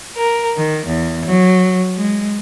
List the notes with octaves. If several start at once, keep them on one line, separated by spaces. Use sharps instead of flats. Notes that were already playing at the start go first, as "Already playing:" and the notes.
A#4
D#3
E2
F#3
G#3